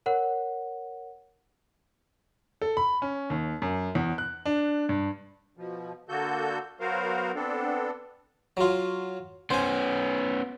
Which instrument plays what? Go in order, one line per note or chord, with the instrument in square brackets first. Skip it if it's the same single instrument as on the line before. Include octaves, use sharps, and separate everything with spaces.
[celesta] A#4 C#5 F#5
[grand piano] A4
B5
C#4
D#2
F#2
E2
F#6
D4
G2
[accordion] B2 F3
D3 A#3 F#4 A4 G6
F#3 B3 F#4 A#4 C5 F5
B3 C4 D4 A4
[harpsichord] F#3 F4
[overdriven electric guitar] B3 C#4 [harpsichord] C5 G#5